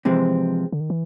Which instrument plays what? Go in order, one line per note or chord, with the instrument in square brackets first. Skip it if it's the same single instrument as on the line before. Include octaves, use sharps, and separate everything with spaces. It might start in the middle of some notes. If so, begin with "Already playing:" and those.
[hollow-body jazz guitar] C3 E3 G#3 C4 [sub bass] F3
[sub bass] D3
D#3
E3